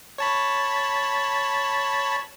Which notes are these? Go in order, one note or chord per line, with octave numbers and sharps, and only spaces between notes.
C#5 A5 B5